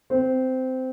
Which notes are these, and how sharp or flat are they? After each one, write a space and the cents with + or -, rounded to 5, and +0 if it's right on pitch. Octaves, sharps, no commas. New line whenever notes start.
C4 -15